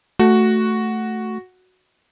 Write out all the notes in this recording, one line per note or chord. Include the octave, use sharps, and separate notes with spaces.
A3 F#4